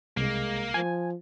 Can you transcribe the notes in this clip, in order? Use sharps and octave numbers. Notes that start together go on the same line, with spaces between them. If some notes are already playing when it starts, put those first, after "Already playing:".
C2 G#3 A#3
F3 G#5